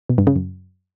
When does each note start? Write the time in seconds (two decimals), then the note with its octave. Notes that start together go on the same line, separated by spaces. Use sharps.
0.09 B2
0.18 G2
0.27 C#3
0.36 F#2